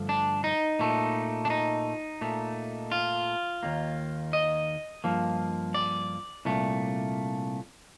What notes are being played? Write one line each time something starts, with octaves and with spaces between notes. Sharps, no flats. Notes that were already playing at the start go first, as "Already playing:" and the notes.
Already playing: G2 D3 F3 A3
D4
D#4
A#2 A3
D4
D#4
A#2 A3
F4
D#2 D#3 A#3
D#5
G2 F3 A#3
D5
C2 A#2 A3